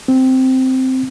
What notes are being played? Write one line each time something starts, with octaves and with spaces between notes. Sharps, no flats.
C4